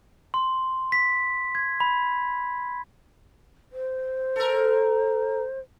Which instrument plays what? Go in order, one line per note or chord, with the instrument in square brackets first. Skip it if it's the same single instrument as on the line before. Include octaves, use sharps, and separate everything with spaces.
[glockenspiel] C6
B6
G#6
B5
[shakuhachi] C5
[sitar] A4 A#4